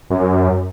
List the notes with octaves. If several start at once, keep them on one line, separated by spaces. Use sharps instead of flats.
F#2